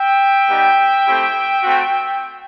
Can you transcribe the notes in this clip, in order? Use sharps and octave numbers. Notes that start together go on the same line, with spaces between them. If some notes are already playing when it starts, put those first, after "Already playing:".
Already playing: E5 G5
G3 B3 D#4 G4
A3 C4 E4 G4
A3 C4 F#4